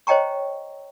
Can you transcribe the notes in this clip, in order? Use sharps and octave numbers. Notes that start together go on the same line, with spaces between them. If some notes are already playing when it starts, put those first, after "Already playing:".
C5 C#5 D#5 G5 A#5 C#6